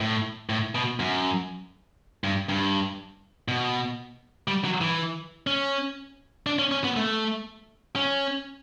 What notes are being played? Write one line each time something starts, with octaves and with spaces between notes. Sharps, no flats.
A2
A2
B2
F#2
G2
G2
B2
G3
F#3
E3
C#4
D4
C#4
C#4
B3
A3
C#4